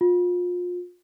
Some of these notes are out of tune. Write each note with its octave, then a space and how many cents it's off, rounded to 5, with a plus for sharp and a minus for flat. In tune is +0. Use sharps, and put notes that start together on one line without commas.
F4 +30